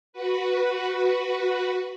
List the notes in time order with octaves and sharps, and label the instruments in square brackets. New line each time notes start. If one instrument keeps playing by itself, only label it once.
[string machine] F#4 B4